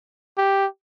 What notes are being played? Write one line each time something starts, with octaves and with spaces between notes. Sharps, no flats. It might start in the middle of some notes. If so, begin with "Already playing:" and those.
G4